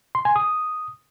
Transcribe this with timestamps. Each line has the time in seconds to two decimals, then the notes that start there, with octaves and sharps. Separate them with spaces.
0.15 C6
0.25 G#5
0.36 D#6